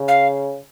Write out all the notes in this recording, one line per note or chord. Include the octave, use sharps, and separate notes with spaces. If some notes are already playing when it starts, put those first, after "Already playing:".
Already playing: C#3
F5